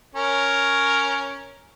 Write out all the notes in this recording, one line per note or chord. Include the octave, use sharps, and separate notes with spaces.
C#4 A#4 C#5